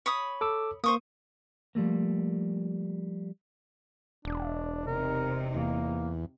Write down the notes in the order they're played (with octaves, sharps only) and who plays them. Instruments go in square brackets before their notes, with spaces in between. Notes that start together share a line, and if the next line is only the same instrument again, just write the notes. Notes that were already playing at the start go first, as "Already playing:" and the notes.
[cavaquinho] C#5 B5 D#6
[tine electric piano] A4 D6 E6
[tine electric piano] A#3 [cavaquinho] C5 C#6 D#6
[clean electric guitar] F3 G3 A3 A#3
[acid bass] E1 [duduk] D4
[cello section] C3 D#4 [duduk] A#4
[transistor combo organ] E2 [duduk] A#3